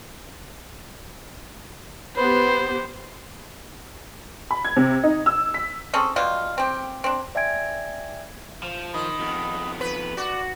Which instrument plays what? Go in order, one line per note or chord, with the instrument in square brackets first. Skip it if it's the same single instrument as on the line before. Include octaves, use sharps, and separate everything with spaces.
[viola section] B3 G4 [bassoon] B4 [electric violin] C5
[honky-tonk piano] B5
G#6
C3
D#4
E6
B6
[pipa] C4 C#4 G#4 A4
B2 G3 F4
C4 G4
C4 D4
[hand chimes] D5 E5 G5 G#5 G#6 D7
[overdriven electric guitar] F3
[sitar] D#3 [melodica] D#5 B5
[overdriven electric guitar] F2 B3
[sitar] B4
[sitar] F#4 [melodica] D5